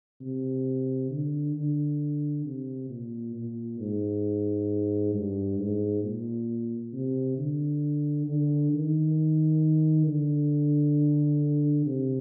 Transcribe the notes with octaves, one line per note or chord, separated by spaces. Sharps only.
C3
D3
D3
C3
A#2
A#2
G#2
G2
G#2
A#2
C3
D3
D3
D#3
D3
C3